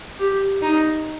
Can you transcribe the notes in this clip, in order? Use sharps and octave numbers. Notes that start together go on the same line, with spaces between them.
G4
D#4